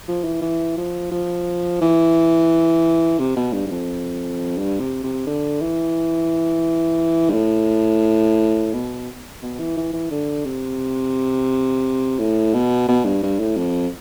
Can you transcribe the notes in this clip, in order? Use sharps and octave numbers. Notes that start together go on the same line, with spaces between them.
F3
E3
E3
F3
F3
E3
C3
B2
G2
G2
F2
G2
C3
C3
D3
E3
G2
A2
B2
B2
E3
E3
E3
D3
C3
A2
B2
B2
G2
G2
A2
F2